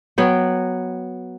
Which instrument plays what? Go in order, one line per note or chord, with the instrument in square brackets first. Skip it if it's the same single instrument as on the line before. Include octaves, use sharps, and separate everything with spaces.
[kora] F#3 B3 G5